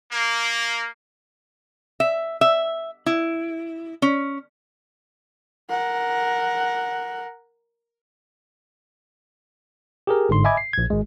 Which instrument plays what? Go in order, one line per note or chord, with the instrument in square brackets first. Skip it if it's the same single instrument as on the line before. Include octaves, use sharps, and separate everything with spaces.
[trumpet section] A#3
[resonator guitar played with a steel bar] E5
E5
E4
C#4
[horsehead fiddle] A#4 F#5
[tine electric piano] G4 G#4 A#4
G1 G#2 D3 C6
D#5 E5 G#5 B5 D6 G#6
C7
A#1 G#6
G#1 G#3